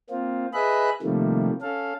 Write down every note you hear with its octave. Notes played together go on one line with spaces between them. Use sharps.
A#3 C4 F4
G#4 B4 D#5 E5 B5 F#6
C3 D#3 F3 G3 A3 A#3
C#4 A4 F5